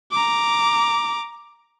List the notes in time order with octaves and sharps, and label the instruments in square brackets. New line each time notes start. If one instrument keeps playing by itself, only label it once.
[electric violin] A#5 D6